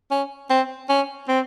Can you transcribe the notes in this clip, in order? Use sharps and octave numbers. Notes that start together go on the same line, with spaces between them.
C#4
C4
C#4
C4